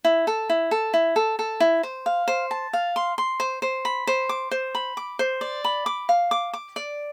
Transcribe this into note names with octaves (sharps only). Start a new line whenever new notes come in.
E4
A4
E4
A4
E4
A4
A4
E4
C5
F5
C5
A5
F5
C6
C6
C5
C5
B5
C5
D6
C5
B5
D6
C5
D5
B5
D6
F5
D6
D6
D5